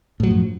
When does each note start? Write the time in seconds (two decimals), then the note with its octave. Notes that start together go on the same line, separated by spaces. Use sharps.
0.20 A2
0.23 F#3
0.27 F3
0.30 F#2